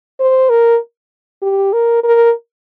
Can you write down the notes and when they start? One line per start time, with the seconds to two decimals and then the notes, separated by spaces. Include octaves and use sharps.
0.20 C5
0.49 A#4
1.42 G4
1.73 A#4
2.04 A#4